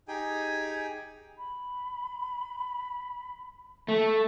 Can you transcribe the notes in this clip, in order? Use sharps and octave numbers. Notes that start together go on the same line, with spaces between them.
D#4 G4 G#4 G5 G#5
B5
A3